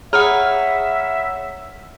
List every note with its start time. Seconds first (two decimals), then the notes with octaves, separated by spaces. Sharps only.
0.13 G#4 C#5 E5 F#5 A#5 B5 D#6 F6